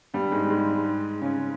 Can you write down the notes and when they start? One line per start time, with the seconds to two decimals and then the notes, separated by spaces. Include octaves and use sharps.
0.14 G2 G3
0.32 G#2 G#3
0.50 G#2 G#3
1.21 C#3 C#4